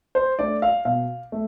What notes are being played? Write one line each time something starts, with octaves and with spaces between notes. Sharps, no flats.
C5
A3 D4 D5
F5
B2 F5
A3